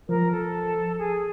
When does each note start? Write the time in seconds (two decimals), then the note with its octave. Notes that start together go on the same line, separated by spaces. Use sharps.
0.08 F3 A#4
0.31 A4
0.98 G#4